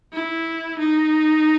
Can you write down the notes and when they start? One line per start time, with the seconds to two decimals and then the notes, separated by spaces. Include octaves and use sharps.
0.13 E4
0.79 D#4